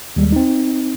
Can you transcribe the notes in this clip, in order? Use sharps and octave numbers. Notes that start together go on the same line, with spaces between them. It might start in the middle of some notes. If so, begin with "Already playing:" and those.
D#2 G3 G#3
C4 D#4